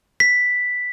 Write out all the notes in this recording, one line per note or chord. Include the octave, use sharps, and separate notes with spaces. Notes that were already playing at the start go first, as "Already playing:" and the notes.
B6